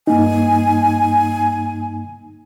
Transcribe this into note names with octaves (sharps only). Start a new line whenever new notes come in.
G2 A#3 D#4 G#5